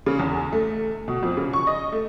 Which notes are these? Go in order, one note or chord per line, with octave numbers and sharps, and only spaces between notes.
C#3
E2
A3
B2
F2
C#3
C#6
D#5
A3